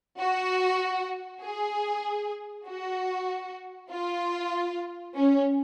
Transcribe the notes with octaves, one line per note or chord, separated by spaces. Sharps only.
F#4
G#4
F#4
F4
C#4